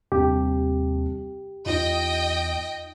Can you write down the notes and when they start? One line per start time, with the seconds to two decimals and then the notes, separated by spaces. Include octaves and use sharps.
0.12 D#2 C3 G3 D4 G4
1.66 E2 D#4 F4 D#5 G5